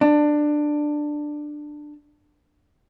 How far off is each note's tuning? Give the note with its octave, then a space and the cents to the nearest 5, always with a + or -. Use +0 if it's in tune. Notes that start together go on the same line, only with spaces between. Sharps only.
D4 +15